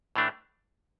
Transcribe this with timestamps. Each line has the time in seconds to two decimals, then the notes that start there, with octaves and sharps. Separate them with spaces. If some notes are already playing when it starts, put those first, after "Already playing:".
0.16 A2 E3 A3 D4